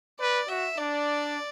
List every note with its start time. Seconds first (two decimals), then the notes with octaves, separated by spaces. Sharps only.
0.20 B4 D5
0.49 F#4 E5
0.78 D4 D5